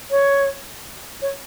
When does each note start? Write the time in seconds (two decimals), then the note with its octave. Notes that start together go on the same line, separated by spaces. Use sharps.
0.11 C#5
1.21 C#5